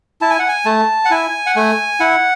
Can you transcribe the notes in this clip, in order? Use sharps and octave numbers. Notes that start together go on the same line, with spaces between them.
E4 A5
G#5
F#5
G#5
A3 A5
F#5
E4 G#5
F#5
A3 G#5
E4 F#5